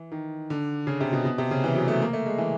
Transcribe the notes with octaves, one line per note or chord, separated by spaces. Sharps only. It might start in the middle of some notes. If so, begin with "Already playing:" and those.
Already playing: E3
D#3
D3
C#3
C3
B2
B2
C3
C#3
E3
F#3
A3
A#3
A3
G#3
E3